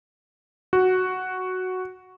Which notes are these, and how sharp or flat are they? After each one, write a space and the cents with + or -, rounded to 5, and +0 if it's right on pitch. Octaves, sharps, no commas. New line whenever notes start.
F#4 +0